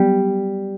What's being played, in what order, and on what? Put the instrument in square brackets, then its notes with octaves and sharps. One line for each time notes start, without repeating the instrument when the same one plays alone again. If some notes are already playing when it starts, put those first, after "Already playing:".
Already playing: [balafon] F#3 B3 [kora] G3